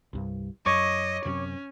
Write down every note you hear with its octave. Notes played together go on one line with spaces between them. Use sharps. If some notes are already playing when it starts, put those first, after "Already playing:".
C2 G2
F#2 C#5 D#5 C#6 D6
F#2 C3 C#4